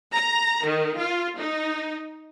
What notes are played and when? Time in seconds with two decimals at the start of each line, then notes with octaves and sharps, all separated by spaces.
0.13 A#5
0.65 D#3
0.98 F4
1.37 D#4